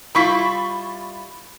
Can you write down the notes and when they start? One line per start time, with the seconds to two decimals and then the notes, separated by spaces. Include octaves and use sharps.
0.15 G3 E4 F4 B5 C#6 B6